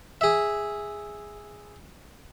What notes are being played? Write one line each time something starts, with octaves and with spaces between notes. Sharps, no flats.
G#4 E5